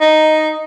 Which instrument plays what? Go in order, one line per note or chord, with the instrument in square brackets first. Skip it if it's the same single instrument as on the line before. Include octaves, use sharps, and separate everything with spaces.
[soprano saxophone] D#4